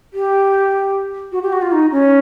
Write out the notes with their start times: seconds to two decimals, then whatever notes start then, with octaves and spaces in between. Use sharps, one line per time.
0.13 G4
1.32 F#4
1.42 G4
1.52 F#4
1.62 F4
1.72 D#4
1.92 C#4